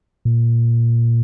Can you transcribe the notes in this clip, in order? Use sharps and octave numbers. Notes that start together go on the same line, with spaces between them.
A#2